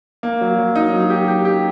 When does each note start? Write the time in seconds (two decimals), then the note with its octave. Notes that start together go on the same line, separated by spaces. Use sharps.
0.23 A#3
0.41 F#3
0.58 F#3
0.75 D#4
0.93 F#3
1.10 G4
1.28 G4
1.45 G4